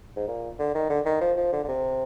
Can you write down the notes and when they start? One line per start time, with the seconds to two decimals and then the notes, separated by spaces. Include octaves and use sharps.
0.16 G#2
0.27 A#2
0.59 D3
0.74 D#3
0.89 D3
1.05 D#3
1.21 F3
1.37 F3
1.52 D3
1.64 D3
1.68 C3